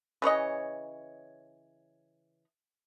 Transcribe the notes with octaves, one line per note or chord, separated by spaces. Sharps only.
C#3 E3 C#5 D#5